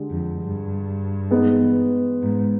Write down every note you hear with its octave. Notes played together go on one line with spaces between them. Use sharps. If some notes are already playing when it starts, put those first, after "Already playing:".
Already playing: D3 G#3 D4 G4
F2
G2
G#3 B3 D#4 B4
G#2